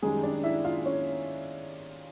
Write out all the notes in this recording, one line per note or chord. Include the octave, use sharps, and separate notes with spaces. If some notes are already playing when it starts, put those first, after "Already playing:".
F#2 D#3 G3 G#3 G#4
D4 D5
E4 E5
F4 F5
C#4 C#5